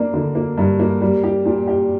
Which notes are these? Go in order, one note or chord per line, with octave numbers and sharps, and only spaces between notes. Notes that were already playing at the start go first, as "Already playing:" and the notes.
Already playing: A#3 D4
D3
A#3
G2
A#3
G3
G4
A#2
G4